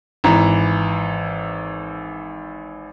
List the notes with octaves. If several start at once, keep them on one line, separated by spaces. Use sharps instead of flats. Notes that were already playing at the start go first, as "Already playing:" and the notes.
G#1 E3 A#5